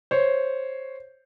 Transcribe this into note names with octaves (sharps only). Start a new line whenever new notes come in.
C5 C#5